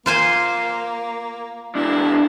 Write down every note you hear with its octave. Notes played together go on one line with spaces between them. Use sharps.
A#3 F4 C5 G#5
E2 D4 E4